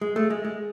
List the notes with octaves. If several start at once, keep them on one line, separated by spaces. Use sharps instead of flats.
G#3
A3
G#3
G#3